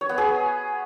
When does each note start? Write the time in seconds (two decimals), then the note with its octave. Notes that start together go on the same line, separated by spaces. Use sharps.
0.01 C#5
0.09 B3
0.18 G#4